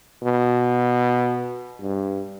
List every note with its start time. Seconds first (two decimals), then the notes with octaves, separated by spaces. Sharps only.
0.23 B2
1.82 G2